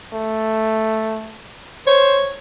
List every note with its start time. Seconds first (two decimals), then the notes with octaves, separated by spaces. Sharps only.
0.13 A3
1.87 C5 C#5